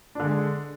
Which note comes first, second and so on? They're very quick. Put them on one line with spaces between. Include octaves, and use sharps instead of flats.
D4 D3 G#3